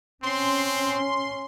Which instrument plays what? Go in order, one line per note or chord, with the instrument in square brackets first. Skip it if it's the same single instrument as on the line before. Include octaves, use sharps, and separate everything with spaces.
[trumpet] C4 [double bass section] C#4 [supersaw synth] C6